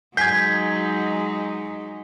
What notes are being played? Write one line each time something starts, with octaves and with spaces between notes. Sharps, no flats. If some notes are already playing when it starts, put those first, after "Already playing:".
F#3 G#3 D#4 G#5 G6 G#6 B6 C7